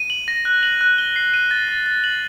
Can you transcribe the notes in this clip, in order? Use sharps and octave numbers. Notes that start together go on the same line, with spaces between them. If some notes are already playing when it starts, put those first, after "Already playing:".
Already playing: D#7
F#7
A#6
F#6
F#7
F#6
G7
C7
D#7
A6
A6
A6
F#7